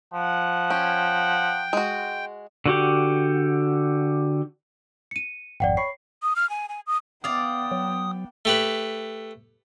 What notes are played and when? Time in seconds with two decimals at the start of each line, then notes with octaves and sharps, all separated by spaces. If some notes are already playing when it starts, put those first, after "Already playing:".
0.13 F3 F#5
0.70 C#4 G5
1.73 G#3 F#4
2.66 D3 F#4 G4
5.11 C#7 D#7
5.60 G#1 F2 D5 F#5 G5
5.77 C#5 B5 C#6 C7
6.23 D#6
6.36 F6
6.50 G#5
6.69 G#5
6.87 D#6
7.24 B3 D5 F5 G5 D#6
7.71 F#3
8.45 A3 G4 B4